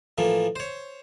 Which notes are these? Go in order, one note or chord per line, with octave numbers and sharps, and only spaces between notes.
A2 E3 F3 A#3
C5 C#5